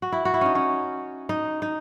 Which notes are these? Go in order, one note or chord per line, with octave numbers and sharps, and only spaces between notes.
F#4
E4
F#4
E4
C#4 D#4
C#4
D#4
D#4